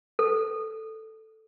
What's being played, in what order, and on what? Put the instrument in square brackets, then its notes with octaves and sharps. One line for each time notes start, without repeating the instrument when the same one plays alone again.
[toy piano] A4